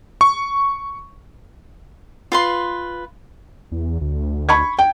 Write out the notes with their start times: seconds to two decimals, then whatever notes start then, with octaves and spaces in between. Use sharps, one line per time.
0.21 C#6
2.32 F4 B4 C6
3.72 E2
4.01 D2
4.49 B5 C#6 G#6
4.79 G5